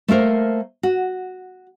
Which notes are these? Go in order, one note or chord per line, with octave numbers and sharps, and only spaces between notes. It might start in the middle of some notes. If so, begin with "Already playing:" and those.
A3 A#3 A#4 C5
F#4